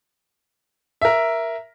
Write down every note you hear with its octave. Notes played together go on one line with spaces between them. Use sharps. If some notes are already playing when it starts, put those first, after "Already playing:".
A#4 E5